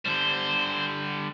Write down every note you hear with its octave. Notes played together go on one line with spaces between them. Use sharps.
D3 G3 C5